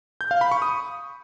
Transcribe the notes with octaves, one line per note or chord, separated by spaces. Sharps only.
G6
F5
B5
C#6
D#6